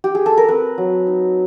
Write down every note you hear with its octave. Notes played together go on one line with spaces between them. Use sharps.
G4
G#4
A4
A#4
C4 B4
F#3
D#4